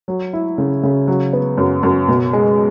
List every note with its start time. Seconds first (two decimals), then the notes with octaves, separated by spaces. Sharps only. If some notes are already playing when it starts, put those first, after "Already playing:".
0.08 F#3
0.33 E4
0.58 C#3
0.83 C#3
1.08 F#3
1.33 B3
1.58 F#2
1.83 F#2
2.08 B2
2.33 G#3